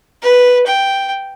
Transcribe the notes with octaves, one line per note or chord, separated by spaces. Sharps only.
B4
G5